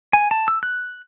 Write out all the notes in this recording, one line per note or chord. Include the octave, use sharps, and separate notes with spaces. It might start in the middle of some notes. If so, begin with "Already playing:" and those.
G#5
A5
E6
F#6